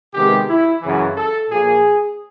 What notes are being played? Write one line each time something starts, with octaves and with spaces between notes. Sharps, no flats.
C3 D#3 G#3 B3 G4
E4
F#2 C#3 E3
A4
A#2 F3 A#3 G#4